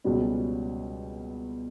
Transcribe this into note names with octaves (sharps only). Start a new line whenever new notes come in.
C#2 B2 G3 C#4